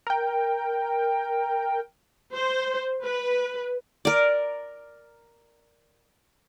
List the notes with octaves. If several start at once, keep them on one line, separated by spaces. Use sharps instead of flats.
A#4 G5
C5
B4
A#4 D5